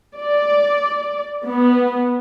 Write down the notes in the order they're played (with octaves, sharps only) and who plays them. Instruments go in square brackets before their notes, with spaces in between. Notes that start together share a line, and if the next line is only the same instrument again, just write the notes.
[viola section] D5
B3